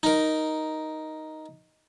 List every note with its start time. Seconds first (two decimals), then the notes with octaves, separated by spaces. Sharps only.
0.03 D#4 A#4